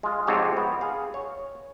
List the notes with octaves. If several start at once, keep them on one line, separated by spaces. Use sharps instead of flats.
G#3 F4
F2 G#2 C3 C4 C#5 A5
B3
G#4 F5
C#5